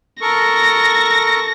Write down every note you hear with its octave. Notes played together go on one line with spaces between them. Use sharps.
A4 A#4 C#6 A#6